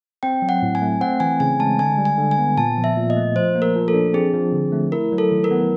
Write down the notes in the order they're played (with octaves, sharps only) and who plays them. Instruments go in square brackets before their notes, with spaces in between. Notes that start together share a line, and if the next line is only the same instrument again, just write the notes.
[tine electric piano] C4 [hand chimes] G5
[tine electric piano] F#3
[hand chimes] F#5
[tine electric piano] A2
[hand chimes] G#5
[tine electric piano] A3
[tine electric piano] C4 [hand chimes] F#5
[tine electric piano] E3 [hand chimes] G#5
[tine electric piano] C#3 [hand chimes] G#5
[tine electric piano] G#3 [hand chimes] A5
[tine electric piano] D3 [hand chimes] G#5
[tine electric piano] G3
[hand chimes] G#5
[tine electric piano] D3
[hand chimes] G#5
[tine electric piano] B3
[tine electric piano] A#2 [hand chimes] A5
[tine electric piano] F3
[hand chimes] E5
[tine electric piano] A#2
[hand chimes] D#5
[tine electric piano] A3
[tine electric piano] F3 [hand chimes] C5
[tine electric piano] A#3
[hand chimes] A#4
[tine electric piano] F3
[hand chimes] A4
[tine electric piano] D4
[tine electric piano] C4 [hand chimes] G#4
[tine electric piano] F3
D3
A3
[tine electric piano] E4 [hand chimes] A#4
[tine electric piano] F#3
[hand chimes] A4
[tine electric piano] D#3
[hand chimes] A#4
[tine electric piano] B3